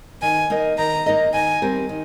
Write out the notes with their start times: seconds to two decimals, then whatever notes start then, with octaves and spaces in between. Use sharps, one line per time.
0.22 D#3 G#5
0.50 A#3 D#4 A#4 D#5
0.78 D#3 A#5
1.06 A#3 D#4 A#4 D#5
1.34 D#3 G#5
1.62 G3 C4 G4 A#4
1.89 D#3